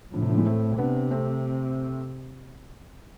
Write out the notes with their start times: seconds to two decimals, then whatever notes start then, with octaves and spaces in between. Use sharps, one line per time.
0.13 A2 D3 F3
0.22 C3 E3
0.30 D3 F3
0.38 E3 G#3
0.46 A3 C4
0.78 C3 B3 D4
1.11 A3 C4